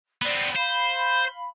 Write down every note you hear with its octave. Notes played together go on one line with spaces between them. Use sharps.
B3 C4 D5
C5 F5 B5